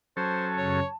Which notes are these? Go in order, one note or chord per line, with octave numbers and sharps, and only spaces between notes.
F#3 C#4 A4 C5 A5
F#2 C#3 C#5